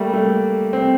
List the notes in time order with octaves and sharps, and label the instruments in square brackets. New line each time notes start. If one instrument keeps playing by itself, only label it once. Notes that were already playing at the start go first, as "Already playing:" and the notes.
Already playing: [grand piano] G3 A3 A#3
A3
C4